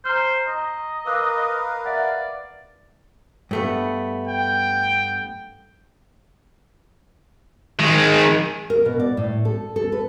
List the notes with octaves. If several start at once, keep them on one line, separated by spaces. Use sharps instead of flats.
C5 A#5 F6
D#5 A#5
A#4 B4 F5 D6 E6 F#6
D5 E5 F#5
G2 A3 B3
G5
D#3 G#3
A#4
B2
D5
A2
A4
A4
B4